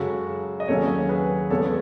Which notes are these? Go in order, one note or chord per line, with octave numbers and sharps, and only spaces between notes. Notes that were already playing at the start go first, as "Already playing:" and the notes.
Already playing: F#2 C#3 G#3 F#4 A4
D#5
D#2 C#3 F#3 C#4 A4 C#5
G#4 B4
E2 C#3 G#3 B3 A4 C#5